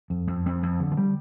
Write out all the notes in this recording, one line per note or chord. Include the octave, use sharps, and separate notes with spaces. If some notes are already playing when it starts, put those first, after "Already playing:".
F2
F2
F2
F2
D3
F3
G3